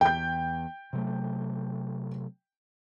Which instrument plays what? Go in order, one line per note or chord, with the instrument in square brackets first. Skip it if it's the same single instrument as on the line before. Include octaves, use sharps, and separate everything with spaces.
[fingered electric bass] E2 [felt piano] G5 G6
[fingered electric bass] C3 F#3 A3